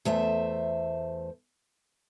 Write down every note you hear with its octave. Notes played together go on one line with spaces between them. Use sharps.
E2 A3 C5 E5